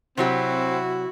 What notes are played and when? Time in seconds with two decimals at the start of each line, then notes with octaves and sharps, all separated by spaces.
0.17 C3 F#3 C4 E4 F#4 G4